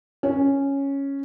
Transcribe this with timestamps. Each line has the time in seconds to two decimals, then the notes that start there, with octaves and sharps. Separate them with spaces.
0.23 C#4